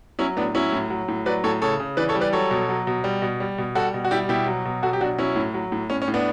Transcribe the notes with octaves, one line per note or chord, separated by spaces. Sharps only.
F#3 C#4 E4
A2 B3 D4
F#3 C#4 E4
A2
F#3
A2
F#3 B4 D5
A2 A4 C#5
C#3 A4 C#5
C#3
E3 B4 D5
A4 C#5
G3
B4 D5
F#3 A4 C#5
B2
F#3
B2
G3
B2
G3
B2
G3 F#4 A4
B2
F#4
G3 E4 G4
B2 E4 G4
F#3
B2
F#3 F#4 A4
G4
B2 D4 F#4
F#3 C#4 E4
A2
F#3
A2
A2 C#4
C#4
A2
B3 D4